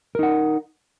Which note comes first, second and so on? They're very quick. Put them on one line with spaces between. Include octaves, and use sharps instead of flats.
A#4 D#4 F#5